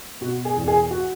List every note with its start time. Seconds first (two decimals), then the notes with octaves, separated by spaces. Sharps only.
0.21 B2 F#4
0.45 G#4
0.56 E2
0.68 G#4
0.91 F#4